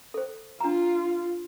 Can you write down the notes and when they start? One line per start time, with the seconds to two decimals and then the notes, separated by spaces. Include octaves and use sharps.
0.14 A4 C5
0.60 D4 F4 A#5